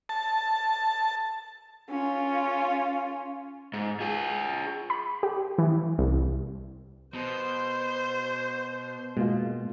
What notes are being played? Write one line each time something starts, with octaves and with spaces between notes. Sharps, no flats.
A5
C#4 F4
G#2
F4 G#4
B5
G4
E3
C2
B2 C5
B2 G#3 A#3 F4